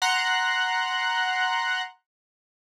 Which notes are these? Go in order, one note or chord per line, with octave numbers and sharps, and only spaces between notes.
F#5 A#5 C6 F#6